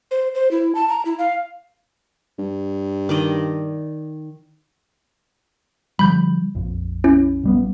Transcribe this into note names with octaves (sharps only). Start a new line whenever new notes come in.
C5
C5
E4
A5
A#5
E4
F5
G2
D#3 D5 D#5
D3 F3 G3 B5 G6
A#1 F2
C#4 E4
A#1 G3 B3